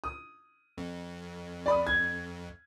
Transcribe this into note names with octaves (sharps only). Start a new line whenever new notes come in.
D#6
F2
D5 B5 D#6
G#6